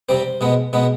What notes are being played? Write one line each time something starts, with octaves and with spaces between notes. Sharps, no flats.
C3 G3 C4 C5
B2 G#3 B3
B2 G#3 B3